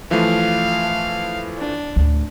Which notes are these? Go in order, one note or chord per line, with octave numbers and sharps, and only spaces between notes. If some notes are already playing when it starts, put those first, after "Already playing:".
E3 F3 A3 F5
D4
D2 A2